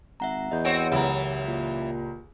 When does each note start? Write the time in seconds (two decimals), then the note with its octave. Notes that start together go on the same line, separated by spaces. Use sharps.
0.20 G#1 E5 F#5 A#5
0.51 E2 D#5 G6
0.65 C4 F#4 C#5 D7
0.92 C#2 F#2 E3 E4 G4 A#5
1.47 A#2